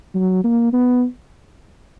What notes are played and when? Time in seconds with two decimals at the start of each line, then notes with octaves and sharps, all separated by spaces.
0.15 F#3
0.44 A#3
0.73 B3